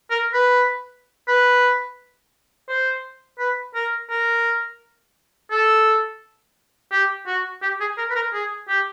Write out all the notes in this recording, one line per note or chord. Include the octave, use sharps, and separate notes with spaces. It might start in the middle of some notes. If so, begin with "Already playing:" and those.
A#4
B4
B4
C5
B4
A#4
A#4
A4
G4
F#4
G4
G#4
A#4
B4
A#4
G#4
G4